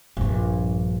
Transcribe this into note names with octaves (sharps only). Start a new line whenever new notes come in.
A#1 G2